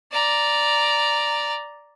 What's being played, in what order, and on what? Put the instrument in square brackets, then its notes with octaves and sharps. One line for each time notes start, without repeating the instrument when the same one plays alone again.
[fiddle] D5 A#5